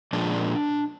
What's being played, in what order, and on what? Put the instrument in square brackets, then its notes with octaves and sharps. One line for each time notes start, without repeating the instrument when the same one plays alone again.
[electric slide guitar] A#2 F3 G#3 D4